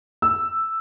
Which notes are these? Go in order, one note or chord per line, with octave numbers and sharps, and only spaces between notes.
E6